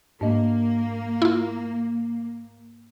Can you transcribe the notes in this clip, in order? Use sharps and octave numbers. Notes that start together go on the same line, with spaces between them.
G#2 A#3 D4 D#5
E4 F4